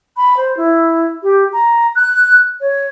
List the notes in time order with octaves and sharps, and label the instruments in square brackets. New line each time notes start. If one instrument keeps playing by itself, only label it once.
[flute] B5
C5
E4
G4
A#5
F#6
C#5